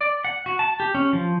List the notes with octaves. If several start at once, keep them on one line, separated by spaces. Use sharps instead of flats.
D5
F#5
F#4
A5
G4
C#4
F3